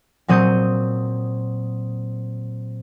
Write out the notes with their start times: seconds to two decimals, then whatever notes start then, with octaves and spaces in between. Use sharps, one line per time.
0.28 A#2 F#3 C4 D#6 G6 C#7